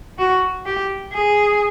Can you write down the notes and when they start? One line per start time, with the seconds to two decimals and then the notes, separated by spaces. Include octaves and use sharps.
0.18 F#4
0.65 G4
1.13 G#4